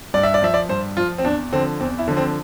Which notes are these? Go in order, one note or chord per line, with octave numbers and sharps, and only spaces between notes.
G2 D5
E5
D5
F3 E5
D5
G2 C5
F3 F4
C4
E2 D4
D3 F3 C4
E2 C4
E4
D3 F3
C4